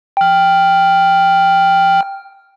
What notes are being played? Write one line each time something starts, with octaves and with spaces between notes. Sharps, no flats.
G5 F6